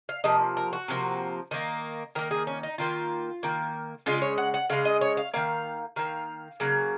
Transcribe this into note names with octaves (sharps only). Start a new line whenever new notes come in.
F5
C3 F3 A#3 D#5
A#4
F#4
C3 F3 A#3
D#3 A#3
D#3 A#3 A#4
G#4
C#4
D#4
D#3 A#3 F4
D#3 A#3
C#3 G#3 F4
C#5
F#5
F#5
C#3 G#3 F5
D#5
C#5
F5
D#3 A#3 F5
D#3 A#3 F5
C#3 F#3 A#3